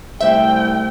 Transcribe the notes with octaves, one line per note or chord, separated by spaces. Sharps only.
C2 A3 C5 E5 G5 E6